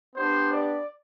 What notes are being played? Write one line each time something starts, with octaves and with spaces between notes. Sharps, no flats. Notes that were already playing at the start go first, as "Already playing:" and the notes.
B3 D4 G4 C5
D5